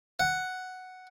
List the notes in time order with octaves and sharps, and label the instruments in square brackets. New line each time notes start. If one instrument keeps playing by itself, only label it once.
[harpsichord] F#5